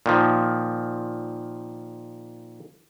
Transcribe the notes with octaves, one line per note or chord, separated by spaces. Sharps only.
A#2 D#3 F3